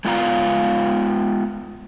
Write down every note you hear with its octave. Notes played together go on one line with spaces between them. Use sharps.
G#3 B3 F4 B4 F5 A#5